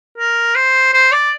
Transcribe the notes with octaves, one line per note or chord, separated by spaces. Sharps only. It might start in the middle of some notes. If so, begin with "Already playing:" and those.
A#4
C5
C5
D5